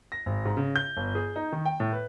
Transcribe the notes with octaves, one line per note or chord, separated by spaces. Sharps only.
A#6
G#1
G#2
C#3
G6
G1
G#4
D#4
D#3
G5
A2
B4